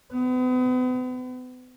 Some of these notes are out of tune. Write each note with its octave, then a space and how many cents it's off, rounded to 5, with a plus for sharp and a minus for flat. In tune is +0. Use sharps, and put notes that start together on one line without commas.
B3 +40